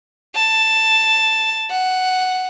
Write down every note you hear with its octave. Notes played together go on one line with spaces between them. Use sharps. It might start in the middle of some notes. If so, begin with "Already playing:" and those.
A5
F#5